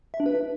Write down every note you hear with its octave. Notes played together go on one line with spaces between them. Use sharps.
E5
D4
B4